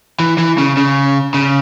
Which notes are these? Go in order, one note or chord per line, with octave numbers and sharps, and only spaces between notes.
E3
E3
C#3
C#3
C#3